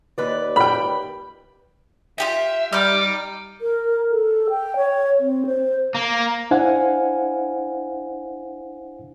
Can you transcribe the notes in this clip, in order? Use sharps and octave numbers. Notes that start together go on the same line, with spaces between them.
D#2 B4 D5
G5 B5
F4 G4 E5 G5
G3 D#5 A#5 D6 F6 G6
A#4
A4
G5
C#5
C4
C5
A#3
D4 E4 C5 F5 F#5 G#5